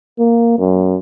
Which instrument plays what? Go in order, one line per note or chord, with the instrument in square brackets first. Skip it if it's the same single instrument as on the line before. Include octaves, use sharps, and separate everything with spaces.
[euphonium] A#3
F#2